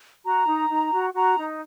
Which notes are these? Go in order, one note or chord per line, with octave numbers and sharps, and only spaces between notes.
F#4 A#5
D#4
D#4
F#4
F#4 A#5
D#4